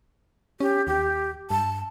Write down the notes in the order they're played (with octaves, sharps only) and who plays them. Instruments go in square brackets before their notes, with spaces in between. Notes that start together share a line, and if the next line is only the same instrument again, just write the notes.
[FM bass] C#4 [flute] G4
[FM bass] D#2 [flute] G4
[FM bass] G2 [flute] A5